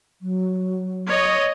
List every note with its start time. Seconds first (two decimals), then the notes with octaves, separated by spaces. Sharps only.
0.22 F#3
1.08 C#5 D#5